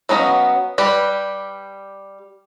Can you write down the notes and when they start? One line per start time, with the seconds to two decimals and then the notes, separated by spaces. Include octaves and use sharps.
0.09 F#3 B3 C#4 D#5 F5
0.78 G3 G4 B4